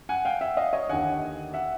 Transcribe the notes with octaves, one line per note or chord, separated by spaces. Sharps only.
F#5 G#5
F5 G5
E5 F#5
D#5 F5
C#5 D#5
D#2 D3 F#5 G#5
E5 F#5